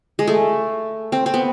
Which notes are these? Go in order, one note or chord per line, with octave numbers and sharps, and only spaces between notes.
G#3
A3
C4
C4
B3